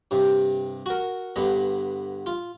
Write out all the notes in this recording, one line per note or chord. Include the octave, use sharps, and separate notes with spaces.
G2 C3
F#4 A#4
G2 D3 B3 A#5
F4